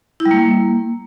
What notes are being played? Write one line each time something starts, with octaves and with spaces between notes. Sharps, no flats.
E4
G3
A#3